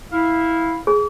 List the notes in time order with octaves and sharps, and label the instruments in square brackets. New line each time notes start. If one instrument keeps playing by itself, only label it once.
[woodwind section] E4 F5
[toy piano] G#4